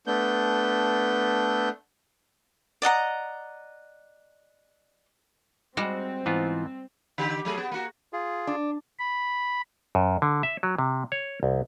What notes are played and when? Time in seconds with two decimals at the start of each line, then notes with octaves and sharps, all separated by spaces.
0.07 A3 B3 D4 G6
2.82 D5 D#5 F#5 A#5
5.77 G3 G#3 C4 F#4
6.26 G#2 E3 B3 F4
7.18 D3 G4
7.45 F#3 A3 G#4
7.58 B3
7.71 A#3 F#4
8.13 F4 G#4
8.47 D4
8.99 B5
9.95 F#2
10.22 D3
10.43 E5
10.63 F#3
10.78 C3
11.12 C#5
11.43 C2